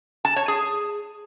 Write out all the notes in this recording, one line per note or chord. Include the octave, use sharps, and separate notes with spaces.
A5
C#5
G#4